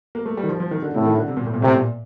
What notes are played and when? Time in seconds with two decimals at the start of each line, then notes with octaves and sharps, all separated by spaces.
0.15 A#3
0.26 A3
0.37 G3
0.43 D#3
0.49 F3
0.60 F3
0.71 D#3
0.82 D3
0.94 A2 C3
1.06 D#3
1.17 D3
1.28 C3
1.37 A#2
1.45 A2
1.54 A#2
1.62 A2 C3
1.74 A#2